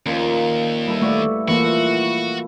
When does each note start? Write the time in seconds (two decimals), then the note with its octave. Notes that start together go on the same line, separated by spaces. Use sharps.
0.06 D#2 A#2 F3 C#4
0.87 G3 E4 A4 B4
1.02 A3 F#4 D5
1.48 E3 F3 A#3 E4 F#4